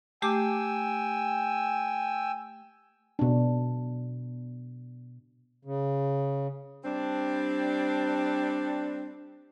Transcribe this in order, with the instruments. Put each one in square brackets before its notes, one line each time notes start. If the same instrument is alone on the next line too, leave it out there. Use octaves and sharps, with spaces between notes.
[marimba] A3 G4 D6 [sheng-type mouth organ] G5 G#5 E6
[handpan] B2 D4
[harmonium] C#3
[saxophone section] G3 C4 D4